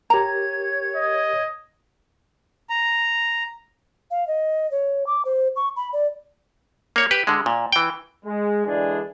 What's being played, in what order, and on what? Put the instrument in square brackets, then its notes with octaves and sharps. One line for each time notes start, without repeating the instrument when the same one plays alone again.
[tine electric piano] G4 A#4 [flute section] C#5 G#6 [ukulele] A#5
[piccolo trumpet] D#5
[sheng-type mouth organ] A#5
[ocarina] F5
D#5
C#5
D6
C5
C#6
B5
D5
[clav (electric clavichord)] A#3 C#5
G4 B4
D3 G#3
A#2
E3 G5
[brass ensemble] G#3
D3 E3 G#3 D4 G#4